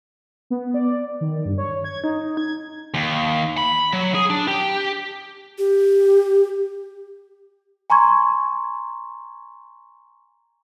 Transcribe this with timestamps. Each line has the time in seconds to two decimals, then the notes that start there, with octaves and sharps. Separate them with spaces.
0.50 B3
0.74 D5
1.21 D#3
1.45 G2
1.58 C#5
1.84 G#6
2.04 D#4
2.37 G#6
2.94 D#2
3.58 B5
3.93 F#3
4.15 G#4
4.30 D4
4.48 G4
5.58 G4
7.90 G#5 A#5 C6 C#6 G#6